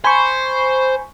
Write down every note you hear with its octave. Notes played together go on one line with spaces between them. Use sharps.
C5 G#5 B5 C#6